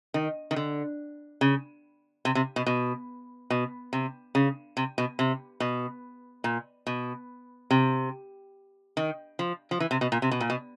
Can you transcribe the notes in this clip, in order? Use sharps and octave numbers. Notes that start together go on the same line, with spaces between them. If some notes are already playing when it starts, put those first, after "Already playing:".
D#3
D#3
D3
C#3
C3
C3
B2
B2
B2
C3
C#3
C3
B2
C3
B2
A#2
B2
C3
D#3
F3
F3
E3
C3
B2
A#2
C3
B2
A#2
B2